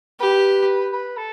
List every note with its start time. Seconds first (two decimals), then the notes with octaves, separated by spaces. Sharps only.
0.20 G4 B4
0.92 B4
1.17 A4